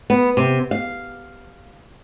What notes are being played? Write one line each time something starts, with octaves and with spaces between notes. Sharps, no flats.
B3
C3
F5